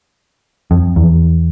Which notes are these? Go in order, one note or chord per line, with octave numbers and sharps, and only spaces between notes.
F2
E2